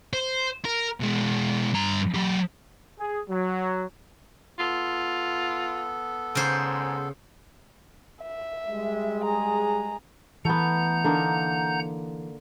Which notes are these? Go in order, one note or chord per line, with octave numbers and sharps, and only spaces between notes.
C5
A#4
B2 G#3
G2 A#5
F#3 G4
G#4
F#3
B3 F4 A4
G#2 C#3 C5
E5
G3 G#3
G#4 A#5
E3 A3 B3 F#5 A#5 G6
D3 A#3 D#4